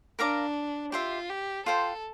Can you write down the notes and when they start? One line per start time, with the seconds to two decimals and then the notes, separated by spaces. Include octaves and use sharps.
0.19 D4 A#4 F5 A#5 D6
0.92 F4 G4 C5 E5
1.29 G4
1.66 F4 A4 C5 G5